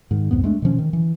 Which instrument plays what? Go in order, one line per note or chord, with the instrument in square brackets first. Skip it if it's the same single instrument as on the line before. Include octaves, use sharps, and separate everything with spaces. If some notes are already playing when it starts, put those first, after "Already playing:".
[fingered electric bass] G#2 D#3
C2 F2 G#2 B3
G#3 A3 D4
B2 D#3 F3 C#4
D#3
E3